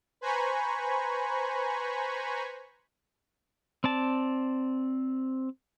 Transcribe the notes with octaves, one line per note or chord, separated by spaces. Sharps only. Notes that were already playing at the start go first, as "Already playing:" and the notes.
B4 C5 G#5 A#5 B5 C#6
C4 D5 A5